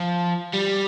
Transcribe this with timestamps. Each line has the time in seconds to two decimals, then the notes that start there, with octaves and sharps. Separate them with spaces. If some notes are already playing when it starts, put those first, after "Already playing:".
Already playing: F3
0.53 G3